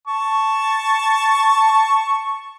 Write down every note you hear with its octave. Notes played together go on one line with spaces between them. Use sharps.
A5 C#6